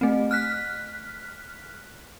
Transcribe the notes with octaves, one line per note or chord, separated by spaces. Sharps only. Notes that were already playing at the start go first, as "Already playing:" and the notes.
A3 C4
F6 F#6 B6